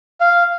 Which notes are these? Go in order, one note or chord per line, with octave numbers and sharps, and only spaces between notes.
F5